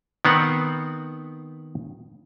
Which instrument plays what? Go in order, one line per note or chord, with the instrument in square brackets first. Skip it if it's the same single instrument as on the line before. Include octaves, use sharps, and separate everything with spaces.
[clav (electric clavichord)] D#3 B3 C4 F#5